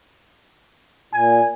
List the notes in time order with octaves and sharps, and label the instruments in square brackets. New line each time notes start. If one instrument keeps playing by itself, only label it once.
[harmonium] A#2 [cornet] G#5